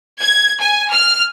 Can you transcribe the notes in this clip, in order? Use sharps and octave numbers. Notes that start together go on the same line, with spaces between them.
G#6
G#5
F6